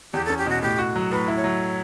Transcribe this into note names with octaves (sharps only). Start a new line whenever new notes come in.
E2 G4
A4
C#4
G4
B2 F#4
A2 G4
F#4
F#3
A2 B4
E4
C#5
F#3